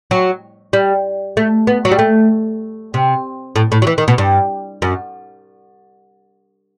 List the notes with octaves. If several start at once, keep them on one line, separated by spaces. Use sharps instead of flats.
F#3
G3
A3
B3
F#3
G3
A3
C3
A2
A2
F#3
E3
D#3
B2
G2
F#2